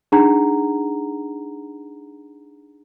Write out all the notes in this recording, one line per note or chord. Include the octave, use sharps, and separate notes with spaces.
D4 D#4 G#4 F#5 A#5